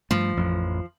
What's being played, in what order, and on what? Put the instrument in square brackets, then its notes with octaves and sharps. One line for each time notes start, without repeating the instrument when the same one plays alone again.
[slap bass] G2 A3 [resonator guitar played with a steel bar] F3
[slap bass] A1 F2